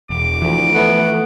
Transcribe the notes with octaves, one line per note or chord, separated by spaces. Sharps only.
E1 D6
D2 E3 F3
A3 B3 F#5